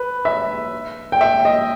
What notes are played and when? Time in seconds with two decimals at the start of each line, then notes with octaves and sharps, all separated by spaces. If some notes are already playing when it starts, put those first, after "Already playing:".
Already playing: B4
0.25 E5
1.12 G5
1.21 E5
1.45 D#5